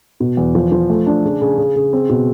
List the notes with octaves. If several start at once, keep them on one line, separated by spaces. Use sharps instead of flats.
B2
E2
F3
F3
A3
D4
C#3
C#3
C#3
C#3
C4
B2